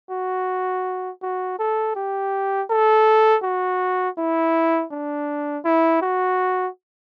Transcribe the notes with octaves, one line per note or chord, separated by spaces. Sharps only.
F#4
F#4
A4
G4
A4
F#4
E4
D4
E4
F#4